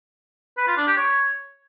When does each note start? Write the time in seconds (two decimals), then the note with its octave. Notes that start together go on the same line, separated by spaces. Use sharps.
0.58 B4
0.68 F4
0.77 D4
0.87 G4
0.97 C#5